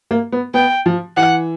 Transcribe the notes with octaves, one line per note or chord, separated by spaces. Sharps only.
A#3
B3
B3 G5
F3
E3 F#5